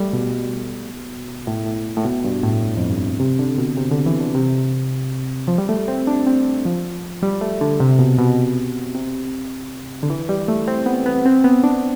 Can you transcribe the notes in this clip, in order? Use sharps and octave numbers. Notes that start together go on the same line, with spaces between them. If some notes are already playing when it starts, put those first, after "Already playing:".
Already playing: G3 A3
B2
A2
A2
A2
B2
G2
A2
F2
G2
C3
D3
B2
C3
D3
E3
D3
C3
F3
G3
A3
C4
D4
C4
F3
G3
A3
D3
C3
B2
B2
C3
D3
E3
G3
A3
C4
B3
B3
C4
B3
D4